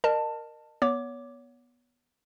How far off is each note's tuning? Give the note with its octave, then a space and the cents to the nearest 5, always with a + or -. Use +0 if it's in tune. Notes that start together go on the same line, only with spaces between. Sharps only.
A#4 +0 D#5 -35 A5 +10
B3 -15 C#5 +30 D6 +0